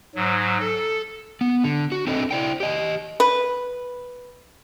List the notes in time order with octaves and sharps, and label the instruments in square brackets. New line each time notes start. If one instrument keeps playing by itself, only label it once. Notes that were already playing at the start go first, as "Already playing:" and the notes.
[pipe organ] G#2 F#3
A4
[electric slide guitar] B3
D3
F#4
C4 D4 A4 D#5
E4 D5 G5
G4 D#5
[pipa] B4